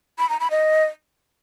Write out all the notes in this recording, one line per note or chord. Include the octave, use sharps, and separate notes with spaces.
B5
A#5
B5
D#5